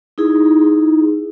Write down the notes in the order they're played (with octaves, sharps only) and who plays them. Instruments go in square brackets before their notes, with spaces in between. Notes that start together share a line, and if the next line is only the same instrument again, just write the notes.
[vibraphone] D#4 E4 G#4